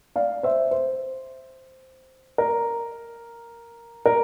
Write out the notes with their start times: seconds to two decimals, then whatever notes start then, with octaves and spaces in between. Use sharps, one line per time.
0.16 D5 F5
0.43 C5 E5
0.71 C5
2.38 A#4
4.06 A#4